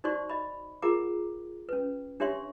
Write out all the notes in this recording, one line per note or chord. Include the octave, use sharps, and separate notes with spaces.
D#4 F#4 C5 D5 C6 C#6
D#5 B5
F4 G#4 A#4 F#5 A#5 D6
C#4 B4
D4 G4 C#5 E5 C6 C#6